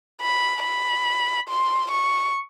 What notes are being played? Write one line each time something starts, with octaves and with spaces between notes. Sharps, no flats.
B5
B5
C6
C#6